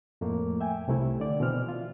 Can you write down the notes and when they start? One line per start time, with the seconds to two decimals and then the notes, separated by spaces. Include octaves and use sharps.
0.21 F2 A2 A3 A#3
0.61 E5 G5 G#5
0.88 C2 C3 A3 E4
1.20 D3 D5
1.40 B2 E3 C4 F6
1.69 F4